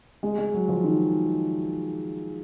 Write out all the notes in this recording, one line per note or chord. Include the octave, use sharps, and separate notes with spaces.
G#3
G#3
F#3
F3
D#3